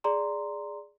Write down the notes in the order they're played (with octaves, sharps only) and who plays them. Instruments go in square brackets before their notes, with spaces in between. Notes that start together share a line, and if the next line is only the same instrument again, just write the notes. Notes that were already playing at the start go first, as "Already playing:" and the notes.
[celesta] G#4 D5 A#5 C6